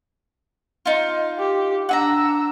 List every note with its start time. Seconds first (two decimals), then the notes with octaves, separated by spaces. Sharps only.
0.85 D#4 F4
1.38 G4
1.89 D4 F#5 G#5 A#5 E6